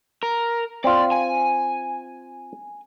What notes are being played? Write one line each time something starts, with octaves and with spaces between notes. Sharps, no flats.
A#4
C4 F4 D5
G#5